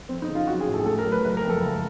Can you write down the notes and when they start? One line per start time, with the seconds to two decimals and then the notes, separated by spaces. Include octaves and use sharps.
0.09 F2 C4
0.22 D#4
0.28 C#3
0.35 F4
0.47 F#3 F#4
0.60 G#4
0.66 A2
0.74 A4
0.79 G#4
0.86 A3 A4
0.99 A#4
1.05 F#3
1.12 B4
1.24 F#1 B4
1.37 A#4
1.44 F2
1.50 A4
1.63 C#2